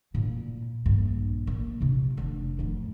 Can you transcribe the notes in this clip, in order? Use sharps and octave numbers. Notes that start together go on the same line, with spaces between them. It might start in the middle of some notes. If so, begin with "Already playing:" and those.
A#2 E4
A#1 G2
A#2
C3 F4
F1 D4
F2 A2